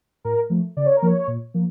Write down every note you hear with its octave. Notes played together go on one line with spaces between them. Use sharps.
A2 A#4
F3 A3
C#3 D5
C#5
A#4
F3 A#3 C#5
A#2
F3 A#3